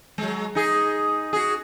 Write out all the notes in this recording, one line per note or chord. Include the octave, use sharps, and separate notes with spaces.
F#3 G#3
D#4 G#4
F#4 G#4